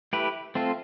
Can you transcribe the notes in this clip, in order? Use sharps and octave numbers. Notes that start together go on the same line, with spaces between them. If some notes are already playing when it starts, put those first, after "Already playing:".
A3 E4 G4 B4
A3 C4 F4 A4